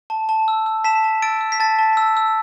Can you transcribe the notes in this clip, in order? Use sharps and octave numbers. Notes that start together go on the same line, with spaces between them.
A5
A5
E6
E6
A5 B6 E7
A5
E6 A6 D7
E6
B6
A5 A6
A5
E6
E6